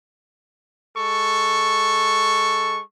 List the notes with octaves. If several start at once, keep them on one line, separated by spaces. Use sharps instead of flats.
G#3 A4 C#6